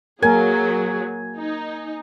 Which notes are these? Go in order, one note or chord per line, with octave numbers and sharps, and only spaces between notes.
F#3 A#3 G#4 A#4 G#5
D#4